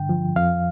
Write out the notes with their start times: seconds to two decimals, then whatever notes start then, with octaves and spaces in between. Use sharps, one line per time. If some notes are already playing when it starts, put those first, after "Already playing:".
Already playing: G2 D3 G5
0.09 F3
0.36 F2 F5